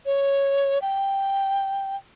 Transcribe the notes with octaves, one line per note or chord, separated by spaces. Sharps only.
C#5
G5